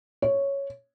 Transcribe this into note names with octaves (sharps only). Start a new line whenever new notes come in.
C#5